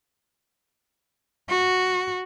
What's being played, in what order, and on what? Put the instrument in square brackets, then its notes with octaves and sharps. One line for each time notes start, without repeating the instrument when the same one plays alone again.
[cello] F#4